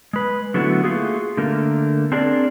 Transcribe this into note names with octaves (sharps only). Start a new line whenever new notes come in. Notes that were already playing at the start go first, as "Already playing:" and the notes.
G#3 B4
D3 F#3 A3 B3 E4 F#4
A3 A#3 F4 F#4 G#4
D3 A3 A#3 A#4
C4 D4 G#4 A#4 C#5 D5